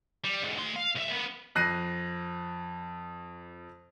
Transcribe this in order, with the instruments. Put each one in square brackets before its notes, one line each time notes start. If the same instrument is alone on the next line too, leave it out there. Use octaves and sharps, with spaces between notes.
[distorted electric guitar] G3
E2 G#2
A3 C6
F5
C2 E5
A#3 B3
[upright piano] F2 F#6 A#6 C7 D#7